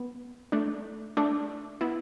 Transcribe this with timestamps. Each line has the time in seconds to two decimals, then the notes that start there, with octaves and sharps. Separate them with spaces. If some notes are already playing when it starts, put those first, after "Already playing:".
Already playing: B3
0.52 A3 D4
1.17 A3 D4
1.81 B3 E4